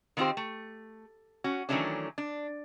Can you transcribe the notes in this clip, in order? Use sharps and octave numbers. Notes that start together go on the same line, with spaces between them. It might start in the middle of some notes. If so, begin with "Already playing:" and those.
D#3 B3 C4 F4 G4 C5
A3
C#4 F#4
D#3 E3 F#3 A3 C#4 D4
D4